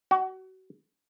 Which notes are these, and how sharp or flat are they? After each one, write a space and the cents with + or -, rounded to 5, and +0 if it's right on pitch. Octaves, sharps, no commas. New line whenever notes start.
F#4 +30